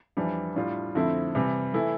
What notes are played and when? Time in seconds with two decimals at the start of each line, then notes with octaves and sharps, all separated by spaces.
0.17 F2 E3 G3 D4
0.56 A2 G3 D4 F4
0.95 F2 D3 A3 C4 E4
1.35 C3 E3 G3
1.74 E3 A3 E4